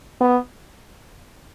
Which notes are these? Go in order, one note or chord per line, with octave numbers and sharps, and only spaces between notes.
B3